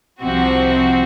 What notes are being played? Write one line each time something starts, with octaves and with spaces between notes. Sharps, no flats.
C2 C3 F3 C4 F#4